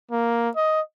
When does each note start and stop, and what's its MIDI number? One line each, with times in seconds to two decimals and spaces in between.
0.11 0.49 58
0.57 0.81 75